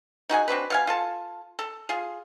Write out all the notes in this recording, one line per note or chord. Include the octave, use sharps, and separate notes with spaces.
D#4 F#4 G#4 G#5
C4 D4 F#4 B4
B2 F5 G#5
F4 A4 A5
A4
F4 G#4